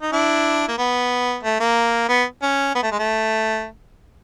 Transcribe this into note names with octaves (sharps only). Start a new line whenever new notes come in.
D#4
D4 E4
A#3
B3
A3
A#3
B3
C#4
B3
A3
G#3
A3